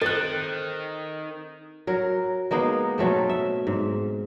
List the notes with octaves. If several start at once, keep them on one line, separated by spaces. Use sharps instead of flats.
D#3 C4 A4 F#6 A6
F#3 A#4
G#3 A#3 B3 D#4
B2 F#3 A3 C4
E5
G#2